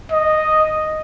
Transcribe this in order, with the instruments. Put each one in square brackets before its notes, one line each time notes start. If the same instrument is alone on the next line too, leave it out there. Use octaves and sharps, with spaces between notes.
[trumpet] D#5